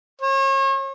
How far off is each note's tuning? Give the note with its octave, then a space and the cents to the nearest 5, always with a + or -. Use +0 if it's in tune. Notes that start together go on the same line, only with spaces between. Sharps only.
C#5 -40